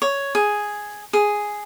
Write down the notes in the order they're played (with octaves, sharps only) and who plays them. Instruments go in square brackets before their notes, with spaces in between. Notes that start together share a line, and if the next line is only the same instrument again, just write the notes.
[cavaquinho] C#5
G#4
G#4